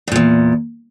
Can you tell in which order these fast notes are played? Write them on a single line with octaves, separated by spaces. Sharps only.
G2 A#2 E2